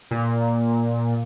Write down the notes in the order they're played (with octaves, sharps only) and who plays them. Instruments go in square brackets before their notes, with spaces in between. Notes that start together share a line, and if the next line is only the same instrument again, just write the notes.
[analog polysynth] A#2